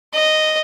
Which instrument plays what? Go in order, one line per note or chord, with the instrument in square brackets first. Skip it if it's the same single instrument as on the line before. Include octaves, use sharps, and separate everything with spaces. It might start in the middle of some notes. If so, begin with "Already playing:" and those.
[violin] D#5